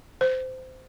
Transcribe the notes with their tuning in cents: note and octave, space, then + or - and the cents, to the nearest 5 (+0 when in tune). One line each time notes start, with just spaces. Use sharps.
C5 -20